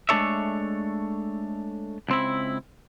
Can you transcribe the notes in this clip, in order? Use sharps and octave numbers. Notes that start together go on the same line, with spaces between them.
G#3 A3 D4 A4 C#5 E5
C#2 C4 E4